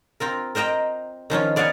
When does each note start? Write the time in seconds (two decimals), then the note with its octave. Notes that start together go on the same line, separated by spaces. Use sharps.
0.20 C4 F4 A#4
0.55 A#4 C5 D#5 G5 A#5
1.30 D#3 F3 C#4 F4
1.56 B3 D5 F5 F#5 G#5